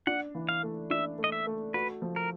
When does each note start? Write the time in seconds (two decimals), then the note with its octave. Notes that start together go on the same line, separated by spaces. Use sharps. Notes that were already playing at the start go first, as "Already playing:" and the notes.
0.07 D4 F#5
0.35 E3
0.49 F5
0.63 A3
0.90 D4 E5
1.18 A3
1.24 D#5
1.32 E5
1.46 A3
1.74 F#4 B4
2.02 F3
2.16 A#4